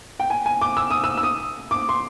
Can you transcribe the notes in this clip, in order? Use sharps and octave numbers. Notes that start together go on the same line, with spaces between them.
G5
G#5
G#5
D6
E6
D#6
E6
E6
D#6
D6
C6